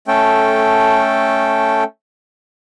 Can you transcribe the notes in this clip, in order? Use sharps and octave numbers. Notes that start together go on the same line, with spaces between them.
A3 C#4 A4 G5